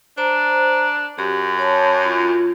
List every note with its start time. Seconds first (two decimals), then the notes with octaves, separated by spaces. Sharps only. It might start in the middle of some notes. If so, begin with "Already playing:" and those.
0.17 D4 C5 A#5
1.18 F#2 G4
1.59 C#5 A5
2.05 F4